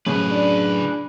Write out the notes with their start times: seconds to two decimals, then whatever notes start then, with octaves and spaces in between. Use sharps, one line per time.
0.06 F#2 A2 C#3 G#4 B4
0.31 D4